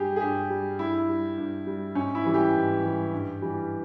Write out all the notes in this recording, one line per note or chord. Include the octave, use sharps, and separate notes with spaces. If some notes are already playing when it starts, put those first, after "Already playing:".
Already playing: G2 G3 G4 G#4
G#4
G2 G4
G3
G2 E4
G3
G2
G3
G#2 C#4
E4
E3 G3
G4
G#2
E3 G3
G2
E3 G3